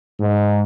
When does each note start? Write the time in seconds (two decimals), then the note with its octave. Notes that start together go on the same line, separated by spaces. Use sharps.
0.20 G#2